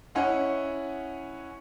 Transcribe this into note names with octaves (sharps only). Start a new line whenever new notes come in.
C#4 E4 D#5 F#5